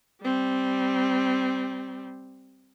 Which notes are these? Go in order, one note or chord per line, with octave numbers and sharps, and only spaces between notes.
G3 C4